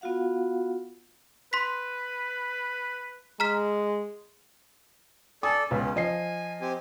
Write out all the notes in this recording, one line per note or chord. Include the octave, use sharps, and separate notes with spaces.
B3 F4 F#4 F5 F#5
B4 C6 B6
G#3 A#5 F6 B6
A4 D5 G#5 D#6
C#2 C#3 B3 C#4
F3 D#5 G#5 C7
C4 G4 G#5